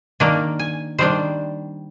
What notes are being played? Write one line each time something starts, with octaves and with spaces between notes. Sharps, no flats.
D#3 A#3 D4
G#5
D#3 G3 D4 C5